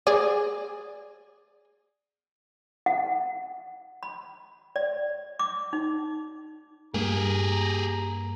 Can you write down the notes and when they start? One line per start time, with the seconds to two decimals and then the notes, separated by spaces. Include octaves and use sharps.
0.07 G#4 D5
2.86 F#5
4.03 B5
4.76 D5
5.39 D6
5.73 D#4
6.94 G2 A#3 G4 G#4 A#5